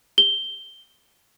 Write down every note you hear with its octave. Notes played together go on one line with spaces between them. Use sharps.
G7